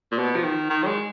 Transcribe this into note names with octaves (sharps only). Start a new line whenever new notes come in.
A#2
B2
F3
D#3
D#3
F#3
G#3